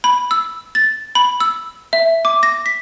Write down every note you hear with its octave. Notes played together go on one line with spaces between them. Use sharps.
B5
E6
A6
B5
E6
E5
D6
A#6
B6